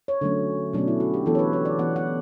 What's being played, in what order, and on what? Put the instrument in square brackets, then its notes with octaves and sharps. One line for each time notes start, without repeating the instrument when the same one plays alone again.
[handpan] C#5
D3 F#3 A3 C#4
B2 F#3 A3 C#4 D4
E4
F#4
G4
E3 B3 A4
C#5
B4
C#5
D5
E3 B3 F#5
F#5